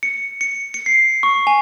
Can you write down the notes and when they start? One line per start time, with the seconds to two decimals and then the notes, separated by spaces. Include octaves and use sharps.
0.03 C#7
0.41 C#7
0.74 C#7
0.86 C7
1.23 C#6
1.47 G#5